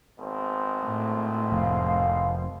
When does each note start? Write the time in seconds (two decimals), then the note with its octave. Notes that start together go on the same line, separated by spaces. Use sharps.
0.19 G#1 B2 C4
0.86 A2
1.52 F1 F5